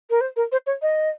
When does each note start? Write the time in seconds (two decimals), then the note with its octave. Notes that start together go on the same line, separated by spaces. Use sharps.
0.10 A#4
0.21 C5
0.36 A#4
0.52 C5
0.67 C#5
0.82 D#5